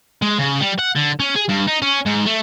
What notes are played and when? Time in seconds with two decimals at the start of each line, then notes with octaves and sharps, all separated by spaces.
0.22 G#3
0.39 C#3
0.60 G3
0.79 F#5
0.96 D3
1.20 C#4
1.35 G#4
1.48 G2
1.67 D#4
1.82 C#4
2.06 G#2
2.26 A3